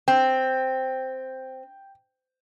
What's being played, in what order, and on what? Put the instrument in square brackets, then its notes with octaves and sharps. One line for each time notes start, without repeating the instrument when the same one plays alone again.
[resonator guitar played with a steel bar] C4 [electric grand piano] G5